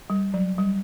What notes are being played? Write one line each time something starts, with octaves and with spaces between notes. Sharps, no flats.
G3
F#3
G3